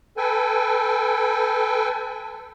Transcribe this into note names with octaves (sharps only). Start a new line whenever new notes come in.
A4 B4 G5 G#5